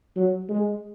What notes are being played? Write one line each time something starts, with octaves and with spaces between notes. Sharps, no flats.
F#3
G#3